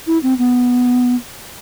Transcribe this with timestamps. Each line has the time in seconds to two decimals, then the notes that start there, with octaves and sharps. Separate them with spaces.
0.07 E4
0.23 C4
0.39 B3